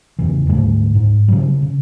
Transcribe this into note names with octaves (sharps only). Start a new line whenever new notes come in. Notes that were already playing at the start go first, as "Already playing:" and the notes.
E2 C#3 E3
D2 G#2 G3 A3
G#2
C#3 F#3 G3
C#3